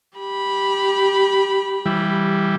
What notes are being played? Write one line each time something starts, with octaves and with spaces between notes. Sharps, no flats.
G4 B5
E3 G3